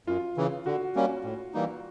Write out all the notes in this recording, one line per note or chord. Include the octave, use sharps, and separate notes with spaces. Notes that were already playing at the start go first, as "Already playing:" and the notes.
F#2 F4
C#3 E3
D3 F#4
G3 A#3 C#4
A2
E3 G3 A#3 D#4